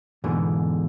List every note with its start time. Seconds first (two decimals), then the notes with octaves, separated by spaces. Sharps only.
0.24 E2 G#2 B2 D3 E3